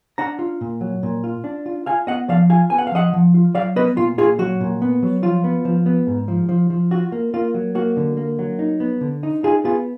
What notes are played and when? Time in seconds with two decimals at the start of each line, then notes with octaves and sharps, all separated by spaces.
0.18 D4 F#5 A#5
0.39 F4
0.61 A#2
0.81 F#3
1.03 A#2
1.24 F4
1.44 D4
1.66 F4
1.86 F4 F5 G#5
2.07 B3 D#5 F#5
2.29 F3 D5 F5
2.50 F4 F5 G#5
2.70 B3 G#5
2.78 F#5
2.87 F5
2.92 F3 D#5 F#5
3.13 F3
3.34 F4
3.55 F#3 D5 F5
3.76 B3 B4 D#5
3.97 A#2 F4
4.18 A#2 F4 G#4
4.39 F#3 F#4
4.61 A#2
4.82 B3
5.03 F#3
5.22 F3 F4
5.44 B3
5.65 F3
5.86 B3
6.07 G#2
6.28 F3
6.49 F3
6.70 F3
6.91 F4 F#4
7.12 A#3
7.34 A#3 F4
7.54 F#3
7.75 A#3 F#4
7.97 D3
8.17 A#3
8.39 F#3
8.59 D#4
8.80 B3
9.01 D3
9.23 D#4
9.43 D#4 F4 G#4
9.64 B3 F4 G#4